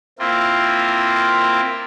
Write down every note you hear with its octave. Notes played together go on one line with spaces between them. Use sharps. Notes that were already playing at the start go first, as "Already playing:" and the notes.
A#3 C4 E4 F4